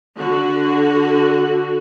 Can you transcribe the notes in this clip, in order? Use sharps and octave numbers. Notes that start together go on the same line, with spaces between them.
D3 F#4